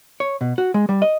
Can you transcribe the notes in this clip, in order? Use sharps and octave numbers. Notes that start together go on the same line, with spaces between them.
C#5
B2
F#4
G#3
G3
D#5